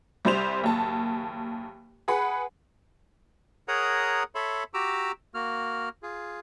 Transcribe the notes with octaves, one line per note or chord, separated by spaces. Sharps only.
C2 G3 C5 F7
F#1 D#2 A5
G#4 B4 F#5 B5
G#4 A#4 C#5 F#5 A#5 D#6
A4 C#5 E5 B5 C6
F#4 G4 A#5 D6 E6
A#3 F#4 F6
F4 G#4